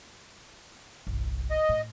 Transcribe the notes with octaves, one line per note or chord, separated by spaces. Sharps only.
G1 C2
D#5
A2